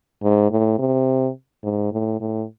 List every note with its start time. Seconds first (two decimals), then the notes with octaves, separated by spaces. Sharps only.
0.23 G#2
0.51 A2
0.79 C3
1.64 G#2
1.92 A2
2.21 A2